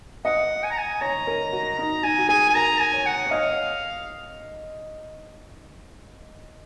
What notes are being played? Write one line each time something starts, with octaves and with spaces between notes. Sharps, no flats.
D#5 F#5
G#5
A#5
G#5
C#5 A#5
A#4
F#4
D#4 A#5
D#4 G#5
F#4
G#4 G#5
G#5
A#4 A#5
G#5
C#5
F#5
C#5
D#5 F5